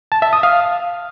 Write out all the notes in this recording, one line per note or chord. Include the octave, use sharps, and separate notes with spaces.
A5
E5
D#6
F5